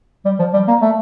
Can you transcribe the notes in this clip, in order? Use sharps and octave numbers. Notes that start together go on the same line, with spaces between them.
G3
F3
G3
A#3
A3